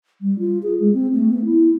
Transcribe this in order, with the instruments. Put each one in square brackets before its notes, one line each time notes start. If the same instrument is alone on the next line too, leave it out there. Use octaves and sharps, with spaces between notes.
[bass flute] G3
F4
G#4
G#3
C4
A3
B3
E4